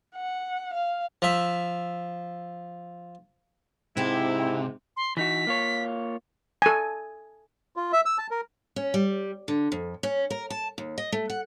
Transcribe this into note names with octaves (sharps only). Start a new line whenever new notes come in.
F#5
F5
F3 E5
G#2 C3 C4 E4 G4
C6
E3 D#4 F#4 B6
A#3 F4 C#5
A4 G#5
F4
E5
E6
A5
A#4
C#4
G3
D3
F2
C#4
A#4
A5
D#2
D#5
A3
F#5